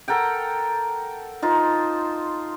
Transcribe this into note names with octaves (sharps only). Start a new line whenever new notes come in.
A4 A#4 F#5 G5
D#4 F4 C5